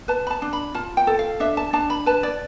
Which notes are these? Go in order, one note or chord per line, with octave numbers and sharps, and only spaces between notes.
B4 A5
B5
A5
D4
B5
F4 A5
G5
A4
F5
D4 E5
A5
D4 A5
B5
B4 A5
D5